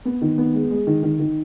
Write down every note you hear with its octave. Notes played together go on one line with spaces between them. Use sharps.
B3
D#3
B3
G#3
G#3
D#3
D#3
D#3